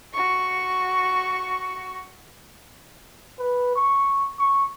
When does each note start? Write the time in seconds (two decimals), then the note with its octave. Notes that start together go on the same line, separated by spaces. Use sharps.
0.13 F#4 C#6
3.39 B4
3.76 C#6
4.39 C#6